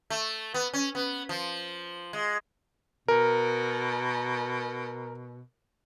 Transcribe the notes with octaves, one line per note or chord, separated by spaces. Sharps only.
A3
B3
C#4
B3
F3
G#3
B2 A#4